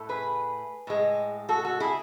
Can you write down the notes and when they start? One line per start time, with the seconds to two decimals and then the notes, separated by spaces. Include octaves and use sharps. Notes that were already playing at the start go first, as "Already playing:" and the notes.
Already playing: A2 A3
0.09 G#4 B4
0.87 A2 G#3
1.49 F#4 A4
1.65 F#4 A4
1.80 E4 G#4